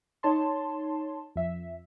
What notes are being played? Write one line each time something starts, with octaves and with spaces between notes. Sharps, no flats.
D#4 C#5 A5 C6
F2 E5